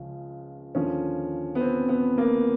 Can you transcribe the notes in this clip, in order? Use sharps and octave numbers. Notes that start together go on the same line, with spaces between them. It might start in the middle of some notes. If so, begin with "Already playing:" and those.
Already playing: C#2 C#3 F3
D#2 D3 F3 C#4
B3
C4
B3
A#3